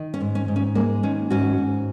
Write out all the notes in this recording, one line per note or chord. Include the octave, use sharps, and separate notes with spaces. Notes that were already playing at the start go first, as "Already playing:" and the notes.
Already playing: D#3
C#4
G#2
C#4
G#2
C#4
G#3 A#3
D#3 C#4
G#2 C#4 F#4
G#2